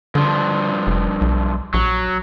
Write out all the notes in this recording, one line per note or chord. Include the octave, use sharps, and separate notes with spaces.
G2 D3 F3
F1
B1
A#1 F#3